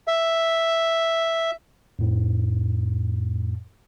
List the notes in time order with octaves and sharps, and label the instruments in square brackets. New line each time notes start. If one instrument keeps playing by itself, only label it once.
[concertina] E5
[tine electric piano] F2 A2